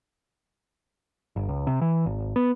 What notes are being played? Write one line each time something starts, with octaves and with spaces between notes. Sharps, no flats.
G1
C#2
C3
E3
G#1
B3